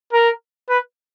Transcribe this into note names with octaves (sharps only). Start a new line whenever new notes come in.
A#4
B4